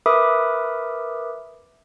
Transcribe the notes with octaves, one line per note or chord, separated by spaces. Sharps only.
A#4 B4 E5 B5 D6 D#6